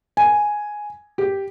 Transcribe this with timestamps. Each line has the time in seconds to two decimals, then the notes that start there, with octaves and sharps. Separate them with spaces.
0.17 G#5
1.18 G4